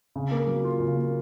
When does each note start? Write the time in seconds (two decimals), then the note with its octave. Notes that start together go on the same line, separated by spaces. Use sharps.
0.16 C#3
0.31 A#3
0.47 F#3
0.64 F4
0.80 C#3
0.97 A#3